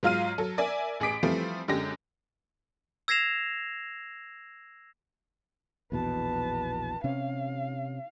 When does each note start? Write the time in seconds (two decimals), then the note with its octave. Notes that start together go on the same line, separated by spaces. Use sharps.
0.03 G#2 F#3 F4 F5 F6 D#7
0.38 F#3 A4
0.58 A#4 D5 E5 G#5
1.00 A1 G#4 D6 B6 D7
1.23 E3 F3 G3 A3 C4
1.68 F#2 D3 G#3 G4 A#6
3.08 E6 G#6 A#6 C7 E7 F7
5.92 A#1 E2 B2 B4 A5
7.04 C3 C#4 F5